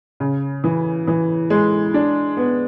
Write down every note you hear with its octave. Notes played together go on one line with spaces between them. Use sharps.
C#3
E3
E3
G#3
D4
B3